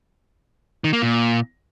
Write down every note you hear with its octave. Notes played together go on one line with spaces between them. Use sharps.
D#3
A#3
A#2